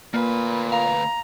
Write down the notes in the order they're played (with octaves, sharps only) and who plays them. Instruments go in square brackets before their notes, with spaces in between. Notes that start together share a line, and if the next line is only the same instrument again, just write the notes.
[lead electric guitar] D2 B4 [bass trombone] A#2 [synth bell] A#3
[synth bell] F5 [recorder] A#5